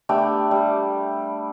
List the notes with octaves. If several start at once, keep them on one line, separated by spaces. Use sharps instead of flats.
A3 B3 D4 G4
G3